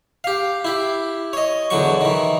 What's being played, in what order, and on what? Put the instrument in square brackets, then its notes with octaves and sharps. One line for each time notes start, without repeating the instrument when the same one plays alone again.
[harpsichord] G4 F5
E4 G4
C#5 D#5
E2 D3 F#3 C#6
D#3 E3